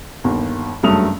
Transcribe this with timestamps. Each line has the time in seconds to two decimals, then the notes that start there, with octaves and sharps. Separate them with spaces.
0.24 G1 D#2
0.83 F#1 G2 F#3 A3 D#6 F7